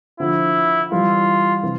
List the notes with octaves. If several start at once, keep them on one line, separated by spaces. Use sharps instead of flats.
D3 F3 E4
E3 G3 F4
C3 E3